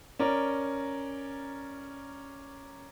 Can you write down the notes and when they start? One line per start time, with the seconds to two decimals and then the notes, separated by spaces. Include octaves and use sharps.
0.19 C#4 A#4 D5 A#5